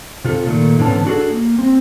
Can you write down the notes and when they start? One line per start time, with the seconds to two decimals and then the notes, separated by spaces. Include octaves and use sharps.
0.24 C3 F4 A4
0.46 A#2 D#3 A3
0.79 G#2 D3 E3 B3 C#4 A5
1.05 D4 F#4 G#4 A4
1.30 A#3
1.59 C4